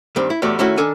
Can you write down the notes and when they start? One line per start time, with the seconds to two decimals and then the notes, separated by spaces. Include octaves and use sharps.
0.16 G2 D#3 G3 C4
0.30 E4
0.42 E2 A2 G3 A3 F#4 D5
0.59 D#3 A3 C#4 E4 F#4
0.77 D#3 D4 A4 G#5